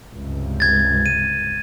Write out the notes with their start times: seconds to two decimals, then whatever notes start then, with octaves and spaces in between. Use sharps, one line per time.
0.13 C#2 G2 C3
0.60 G#6 A6
1.06 D#7